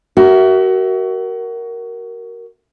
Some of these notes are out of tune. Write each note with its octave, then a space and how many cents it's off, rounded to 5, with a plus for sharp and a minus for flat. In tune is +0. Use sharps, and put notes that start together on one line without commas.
F#4 +30 A#4 +0 E5 +0